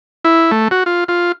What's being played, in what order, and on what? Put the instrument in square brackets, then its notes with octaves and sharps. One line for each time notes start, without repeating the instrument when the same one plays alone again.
[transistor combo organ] E4
A3
F#4
F4
F4